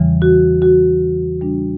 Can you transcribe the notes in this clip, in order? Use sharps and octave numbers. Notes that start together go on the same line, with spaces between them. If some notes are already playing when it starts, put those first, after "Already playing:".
Already playing: E2 C#3 E3 G3
F#4
F#4
C#3 G3 D4